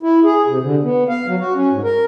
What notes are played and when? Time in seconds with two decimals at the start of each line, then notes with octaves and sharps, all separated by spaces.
0.03 E4
0.24 G#4
0.47 C3
0.62 D3
0.83 B3
1.09 F5
1.27 F#3
1.40 F#4
1.55 C#4
1.71 G#2
1.83 A#4